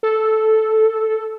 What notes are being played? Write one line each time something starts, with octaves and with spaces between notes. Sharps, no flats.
A4